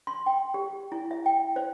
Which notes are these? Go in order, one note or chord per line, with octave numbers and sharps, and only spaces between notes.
C6
G5
G4
E4
E5
G5
C5